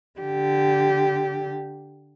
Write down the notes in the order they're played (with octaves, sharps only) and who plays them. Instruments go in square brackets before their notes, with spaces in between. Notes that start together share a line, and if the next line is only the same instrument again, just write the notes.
[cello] D3 G4